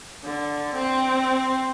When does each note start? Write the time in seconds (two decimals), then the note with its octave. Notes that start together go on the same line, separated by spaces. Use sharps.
0.24 D3
0.74 C4